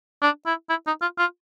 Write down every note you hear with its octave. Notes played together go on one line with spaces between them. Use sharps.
D4
E4
E4
D#4
F4
F4